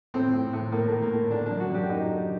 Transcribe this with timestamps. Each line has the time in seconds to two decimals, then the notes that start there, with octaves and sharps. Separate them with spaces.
0.14 A2 C4
0.33 A2
0.53 A2
0.72 A2 A#3
0.87 A3
0.92 A2
1.02 A#3
1.11 A2
1.31 D3 D4
1.46 F#2 D4
1.60 F#4
1.70 F#2 G4
1.89 F#2 D#4
2.09 D3